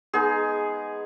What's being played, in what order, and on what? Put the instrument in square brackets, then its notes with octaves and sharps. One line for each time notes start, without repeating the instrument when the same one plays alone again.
[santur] G#3 B3 D#4 G#4